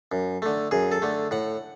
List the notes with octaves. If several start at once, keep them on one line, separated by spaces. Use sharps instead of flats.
F#2
D3 A3
F#2 G#4
A4
D3 A3
A2 F#5